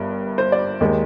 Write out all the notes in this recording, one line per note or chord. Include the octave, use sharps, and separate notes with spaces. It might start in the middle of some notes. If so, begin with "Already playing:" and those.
Already playing: G1 G2 A#3
C5
D5
D#2 D#3 G#3